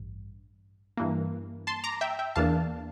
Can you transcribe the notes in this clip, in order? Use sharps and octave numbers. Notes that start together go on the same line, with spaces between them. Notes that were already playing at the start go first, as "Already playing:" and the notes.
Already playing: A1 G2
G2 E3 A#3
A5 C6
A#5 D6
E5 G5
E5 G5
E2 E3 A#3 D4 F5 A5